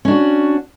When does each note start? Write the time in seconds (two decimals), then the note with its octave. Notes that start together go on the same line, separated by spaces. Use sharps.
0.05 C#4
0.08 D4
0.11 F#4